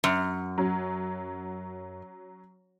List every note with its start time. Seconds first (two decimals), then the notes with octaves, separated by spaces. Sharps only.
0.04 F#2
0.58 F#3 C#4